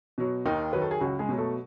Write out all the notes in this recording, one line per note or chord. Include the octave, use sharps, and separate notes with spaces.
B2 F#3
D#2 D#3 D#4
D#3 F#3 B4
A4
G#4
C#2 F#3 F#4
G#3 G#4
B2 F#3
A3 A4